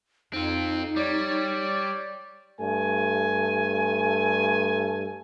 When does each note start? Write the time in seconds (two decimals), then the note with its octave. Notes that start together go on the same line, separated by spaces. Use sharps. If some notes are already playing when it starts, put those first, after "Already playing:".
0.33 F2 C4 D#4 F4
0.96 G3 C#5 D5
2.60 G2 A3 G#5